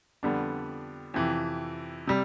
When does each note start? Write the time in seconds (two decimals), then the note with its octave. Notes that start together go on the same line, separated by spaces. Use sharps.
0.23 F2 D3 G3 B3 D4
1.14 F2 C3 E3
2.07 C3 G3